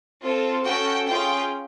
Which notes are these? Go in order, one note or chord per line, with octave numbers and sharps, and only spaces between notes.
C4 F4 A4
C#4 F#4 A4 G5
C#4 F4 G#4 G5